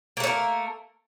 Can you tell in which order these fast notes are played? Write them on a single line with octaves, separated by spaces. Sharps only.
A#3 A3 C#5 A#4